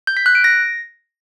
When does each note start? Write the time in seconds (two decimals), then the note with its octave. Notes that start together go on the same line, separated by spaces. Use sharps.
0.07 G6
0.17 B6
0.26 F#6
0.35 D7
0.44 A#6